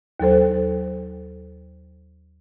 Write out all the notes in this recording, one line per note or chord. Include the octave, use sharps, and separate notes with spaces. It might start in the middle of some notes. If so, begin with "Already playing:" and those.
D#2 F#3 A4 C5